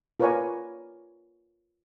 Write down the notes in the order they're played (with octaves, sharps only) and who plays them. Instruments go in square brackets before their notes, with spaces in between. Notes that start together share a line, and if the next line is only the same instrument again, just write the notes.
[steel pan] F4 A#4 B4 C#5 D5 G#5